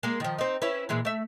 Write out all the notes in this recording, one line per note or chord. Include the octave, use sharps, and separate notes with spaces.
G#3 A#3
D#3 F3
C4 D#4
C#4 E4 B4
A#2 E3 G#3
A3 E5